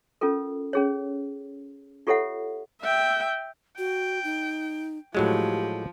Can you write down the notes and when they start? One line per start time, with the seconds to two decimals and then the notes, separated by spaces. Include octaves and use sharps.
0.21 C#4 F4 A4 A#4
0.73 C#4 G#4 C#5
2.07 F4 G4 A4 C#5 E5 F#5
2.82 E5 G5
3.78 F#4 G5
4.24 D#4
5.15 A2 F3 F#3 G#3 G4